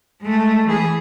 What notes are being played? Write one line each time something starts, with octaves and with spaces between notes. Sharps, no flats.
G#3 A3
E3 G#4